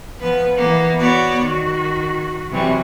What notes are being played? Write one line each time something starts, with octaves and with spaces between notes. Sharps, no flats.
F3 B3 B4
E3 A#3 B3
B3 F#4 C#5 D5
D#3 F#4
C3 E3 F#3 G3